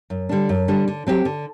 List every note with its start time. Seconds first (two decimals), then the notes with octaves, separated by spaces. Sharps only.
0.10 F#2
0.29 D3 G3 D4
0.49 F#2
0.68 D3 G3 D4
0.88 D3
1.07 F#3 C4 G4
1.25 D3